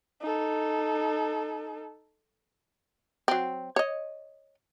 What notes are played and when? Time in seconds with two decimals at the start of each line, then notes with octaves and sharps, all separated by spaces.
0.21 D#4 A4
3.28 F#3 C4
3.76 C#5 D#5